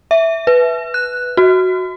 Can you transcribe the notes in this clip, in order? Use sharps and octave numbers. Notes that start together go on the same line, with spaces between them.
E5
B4
F#6
F#4